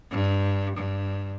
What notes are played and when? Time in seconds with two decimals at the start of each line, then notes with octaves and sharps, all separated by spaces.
0.11 G2
0.76 G2